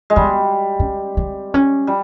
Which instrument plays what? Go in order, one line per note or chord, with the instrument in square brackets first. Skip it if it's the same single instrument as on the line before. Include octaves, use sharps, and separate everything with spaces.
[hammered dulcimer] G#3
[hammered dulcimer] G3 [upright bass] B3
[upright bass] C#4
C4
C#4
[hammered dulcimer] G3